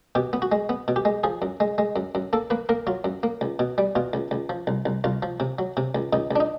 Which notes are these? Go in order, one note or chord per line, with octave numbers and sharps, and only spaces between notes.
B2 G4
B3
F#4
G#3
B3
B2
G4
G#3
F3 G#4
F#2
G#3
G#3
F#2
F#2
A#3 A4
A#3 B4
A#3 A#4
F#3 F4
F#2
A#3
C#2
B2
G3
B2 F4
C#2
C#2
F3
C2
C2
C2 F4
F3
C3
F#3
C3
C#2
C#2 D#4
C#2 D4
D#4